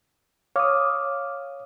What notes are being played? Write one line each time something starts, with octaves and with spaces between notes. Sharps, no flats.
C#5 F5 D6 D#6 F6